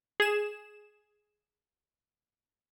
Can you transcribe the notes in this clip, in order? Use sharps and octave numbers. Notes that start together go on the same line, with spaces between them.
G#4 E7